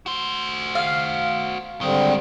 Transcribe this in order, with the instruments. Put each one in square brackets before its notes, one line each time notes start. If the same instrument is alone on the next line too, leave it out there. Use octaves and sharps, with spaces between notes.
[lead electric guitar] F#4 C5
[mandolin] F5
[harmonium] D3 G3 C4 [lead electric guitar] D#3 G#3